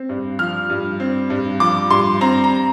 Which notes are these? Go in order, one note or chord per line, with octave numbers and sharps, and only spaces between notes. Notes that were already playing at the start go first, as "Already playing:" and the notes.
Already playing: C4
G2
F3 F6
G2
C4
G2
F3 D6
G2 C6
C4 A#5
A#5